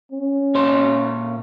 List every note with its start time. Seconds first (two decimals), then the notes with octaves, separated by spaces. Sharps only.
0.12 C#4
0.55 A#2 C#5 C6